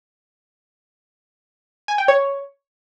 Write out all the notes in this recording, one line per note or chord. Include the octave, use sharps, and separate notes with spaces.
G#5
G5
C#5